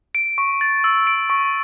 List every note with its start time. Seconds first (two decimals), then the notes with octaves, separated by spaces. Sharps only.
0.15 D7
0.38 C#6
0.61 A6
0.84 E6
1.07 D7
1.30 C#6